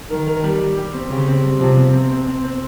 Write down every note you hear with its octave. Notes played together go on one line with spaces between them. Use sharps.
D#3 A#4
A#4
G3
G3
G4
C4
C#3 G4
C4
G3
C3 F3
C3
C4
C4
C4
C4